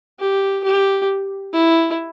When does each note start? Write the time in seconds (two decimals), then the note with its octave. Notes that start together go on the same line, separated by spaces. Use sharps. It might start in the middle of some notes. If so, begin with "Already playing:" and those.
0.19 G4
0.64 G4
1.53 E4